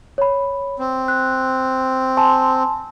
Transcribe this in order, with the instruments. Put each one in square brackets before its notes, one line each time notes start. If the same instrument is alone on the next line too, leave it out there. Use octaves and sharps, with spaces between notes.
[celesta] C#5 B5
[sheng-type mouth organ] C4
[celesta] F#6
G#5 A5 C6